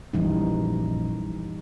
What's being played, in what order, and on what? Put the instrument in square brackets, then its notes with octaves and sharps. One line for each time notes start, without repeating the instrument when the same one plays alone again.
[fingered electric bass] A#1 F#2 [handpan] E3 G3 D#4